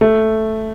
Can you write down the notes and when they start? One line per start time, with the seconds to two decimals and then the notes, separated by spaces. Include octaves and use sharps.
0.01 A3